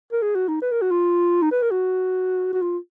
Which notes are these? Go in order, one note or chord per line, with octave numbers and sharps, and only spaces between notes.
A#4
G#4
F#4
D#4
B4
A#4
F#4
F4
D#4
B4
A#4
F#4
F#4
F4